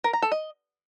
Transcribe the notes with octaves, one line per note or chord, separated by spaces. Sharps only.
A#4
A#5
A4
D#5